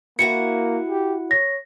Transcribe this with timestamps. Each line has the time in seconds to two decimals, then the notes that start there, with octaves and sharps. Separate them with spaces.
0.19 A#3 E4 F#4 F#5 C#7
0.90 G4
1.31 C#5 A#6